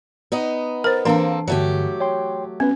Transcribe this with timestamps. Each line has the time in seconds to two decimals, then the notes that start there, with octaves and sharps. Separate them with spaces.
0.32 B3 D#4 D#5
0.84 A#4 C5 A#5 A6
1.05 E3 A#3 C4 D4 A4 C5 F5
1.48 G2 D3 F#3 A3 G4
2.00 C#5 G5 C6
2.60 B3 C#4 B4